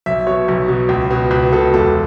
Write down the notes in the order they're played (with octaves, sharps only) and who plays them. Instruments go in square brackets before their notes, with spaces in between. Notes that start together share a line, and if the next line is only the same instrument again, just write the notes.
[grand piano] B1 E5
B2 C#5
B1
B2
C#2
B2
C#2 B4
B2 A4
E1 A4